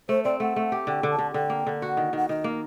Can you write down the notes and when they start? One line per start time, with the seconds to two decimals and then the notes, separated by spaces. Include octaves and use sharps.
0.09 A3 C5
0.24 C4 D5
0.40 A3 F#5
0.56 A3
0.72 G4
0.87 D3 G5
1.03 D3
1.11 A5
1.19 D3
1.34 D3 G5
1.50 A#3
1.67 D3
1.82 F#4 F#5
1.97 D#3
2.13 D#3 F#5
2.29 D#3 D#5
2.44 A#3